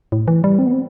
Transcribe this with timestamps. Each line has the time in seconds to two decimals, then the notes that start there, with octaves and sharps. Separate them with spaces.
0.12 A2
0.28 E3
0.44 G3
0.59 C4
0.66 B3
0.73 C4